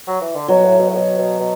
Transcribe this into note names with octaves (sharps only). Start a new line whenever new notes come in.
F#3
E3
D3
B2 F#3
A2
B2
A2
B2
B2
B2